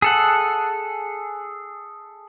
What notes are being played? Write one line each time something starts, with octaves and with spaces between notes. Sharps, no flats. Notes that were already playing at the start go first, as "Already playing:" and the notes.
G#4 A4 F#5